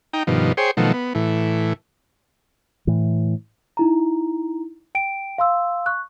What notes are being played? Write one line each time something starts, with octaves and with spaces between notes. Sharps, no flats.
D#4 G5 A#5
G2 B2 D#3 F3
G#4 C5 C#5 G5
B2 D#3 F3 F#3 A3
B3
A2 E3
A2 E3
D#4 E4 A#5
G5 D7
F5 C6 E6
C#6 F#6